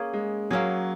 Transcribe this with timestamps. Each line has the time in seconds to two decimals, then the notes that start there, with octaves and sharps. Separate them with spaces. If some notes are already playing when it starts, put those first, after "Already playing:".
Already playing: A#3 C#4 G#4
0.13 G#3
0.51 F#3 A#3 C#4 G#4